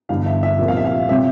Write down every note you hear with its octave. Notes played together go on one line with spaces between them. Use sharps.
G1 G2 E3 F5
E5
E5
C2 A#2 F3 C4
F5
E5
F5
C3 G3 C#4 E5